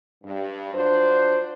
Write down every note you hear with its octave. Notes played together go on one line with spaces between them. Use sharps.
G2
F#3 D4 F4 C5